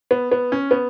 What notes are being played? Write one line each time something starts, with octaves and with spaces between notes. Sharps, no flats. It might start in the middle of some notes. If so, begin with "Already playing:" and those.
B3
B3
C#4
B3